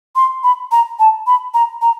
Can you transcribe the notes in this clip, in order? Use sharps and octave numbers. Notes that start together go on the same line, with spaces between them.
C6
B5
A#5
A5
B5
A#5
A#5